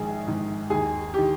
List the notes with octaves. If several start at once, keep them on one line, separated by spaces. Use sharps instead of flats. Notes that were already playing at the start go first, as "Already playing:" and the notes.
Already playing: A#1 G#2 D#3 G#4
A#1 G#2 D#3
D#2 D#3 G#4
D#3 G4